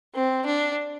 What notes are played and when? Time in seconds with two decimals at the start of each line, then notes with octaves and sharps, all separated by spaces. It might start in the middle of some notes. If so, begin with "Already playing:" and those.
0.13 C4
0.45 D4